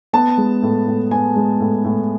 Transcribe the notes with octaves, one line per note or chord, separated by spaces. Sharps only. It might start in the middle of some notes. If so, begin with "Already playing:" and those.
B3 A5
G#3
A2
A2
B3 G#5
G#3
A2
A2